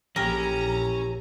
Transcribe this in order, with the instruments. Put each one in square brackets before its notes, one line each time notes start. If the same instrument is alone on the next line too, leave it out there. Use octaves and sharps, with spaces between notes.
[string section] A#1 A#5 [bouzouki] E3 G4 A4 [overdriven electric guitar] C#4 [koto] A#4